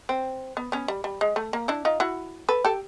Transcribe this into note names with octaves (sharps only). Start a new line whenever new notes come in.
C4
B3
B3 C#4
G3
G3
G#3
A3
A#3
D4 E4
D#4 F4
E4 F#4
A4 B4
G4 A4